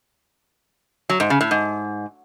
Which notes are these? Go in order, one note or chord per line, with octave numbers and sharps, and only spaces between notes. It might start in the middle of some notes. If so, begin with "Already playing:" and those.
F#3
G#2
C#3
A2
G#2